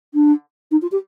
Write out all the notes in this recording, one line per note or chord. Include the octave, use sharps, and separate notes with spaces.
D4
D#4
F4
G4